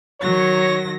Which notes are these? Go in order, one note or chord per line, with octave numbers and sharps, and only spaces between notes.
D#3 F#3 C#5 A#6